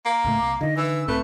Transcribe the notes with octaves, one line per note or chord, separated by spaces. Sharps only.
A#3
C#2 A2 A3
C2 D6
D3 D#3 D#5
E3 E6
B1 G#2 A3 C4 B4